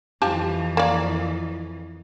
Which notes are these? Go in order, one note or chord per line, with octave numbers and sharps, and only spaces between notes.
F2 E3 F3 G4 A5
A#3 D5